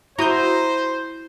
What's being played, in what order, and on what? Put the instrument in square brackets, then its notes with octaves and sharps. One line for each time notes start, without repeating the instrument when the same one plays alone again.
[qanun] E4 [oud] F#4 [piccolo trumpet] C5 [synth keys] A#5 D#6 G6